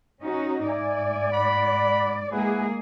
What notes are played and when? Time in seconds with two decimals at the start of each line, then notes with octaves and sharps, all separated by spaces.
0.22 C#4 D#4 F#4
0.68 G#2 D5 E5 G#5
1.33 F#5 B5
2.32 G#3 A#3 E4 G#4 B4 F#5